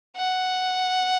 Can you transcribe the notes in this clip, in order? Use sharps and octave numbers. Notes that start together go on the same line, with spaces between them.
F#5